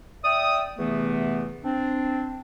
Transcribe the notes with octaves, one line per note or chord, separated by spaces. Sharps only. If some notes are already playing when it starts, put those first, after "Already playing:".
D5 E5 G5 D#6
E2 C3 E3 A3 B3
C4 D4